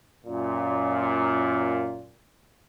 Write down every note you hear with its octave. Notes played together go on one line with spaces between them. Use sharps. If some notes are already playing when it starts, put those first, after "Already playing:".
F#2 A#2